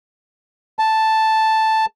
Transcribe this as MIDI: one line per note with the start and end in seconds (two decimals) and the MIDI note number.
0.79 1.85 81